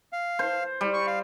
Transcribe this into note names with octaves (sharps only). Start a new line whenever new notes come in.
F5
C5
G3
C#6
F5